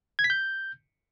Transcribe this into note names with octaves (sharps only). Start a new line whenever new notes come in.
G#6
B6
G6